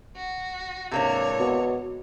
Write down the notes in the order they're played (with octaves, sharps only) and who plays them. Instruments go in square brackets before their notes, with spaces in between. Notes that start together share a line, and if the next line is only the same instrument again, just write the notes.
[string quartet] F#4
[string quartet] G#2 E3 C#5 [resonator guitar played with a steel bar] C3 A#3 D4
[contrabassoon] B2